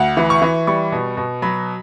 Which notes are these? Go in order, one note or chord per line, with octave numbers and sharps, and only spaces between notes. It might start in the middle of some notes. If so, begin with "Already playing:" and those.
Already playing: D2 F#5
E3
C#6
E3
G3 C#6
B2
B2
F#3 B5